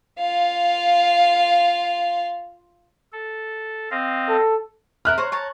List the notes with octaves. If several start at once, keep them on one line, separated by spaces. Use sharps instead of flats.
F4 F5
A4
C4 D#5 F5
A4
A#4 E5 B5 F6 F#6
C5 C#5 A#5
C#5 A5 A#5